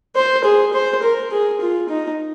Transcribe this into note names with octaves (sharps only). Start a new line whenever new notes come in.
C5
G#4
C5
A#4
G#4
F4
D#4